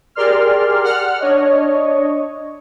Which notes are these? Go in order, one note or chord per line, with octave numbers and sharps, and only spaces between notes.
G4 G#4 A#4 D5 C6 F6
F#5 F6
D4 C#5 D#5